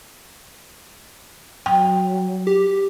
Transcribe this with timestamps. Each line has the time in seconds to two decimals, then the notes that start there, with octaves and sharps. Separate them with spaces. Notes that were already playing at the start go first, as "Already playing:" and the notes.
1.66 F#3 G5
2.47 G4